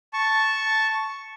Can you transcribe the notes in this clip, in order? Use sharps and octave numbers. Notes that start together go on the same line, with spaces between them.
A5 C#6